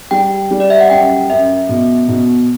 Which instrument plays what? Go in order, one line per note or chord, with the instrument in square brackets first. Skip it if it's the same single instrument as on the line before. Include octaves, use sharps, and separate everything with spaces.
[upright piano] G3 [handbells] G5
[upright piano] G3
[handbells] D5
E5
F#5
[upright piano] F#2 [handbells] G5
[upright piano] F#2 [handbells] E5
[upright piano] B2
B2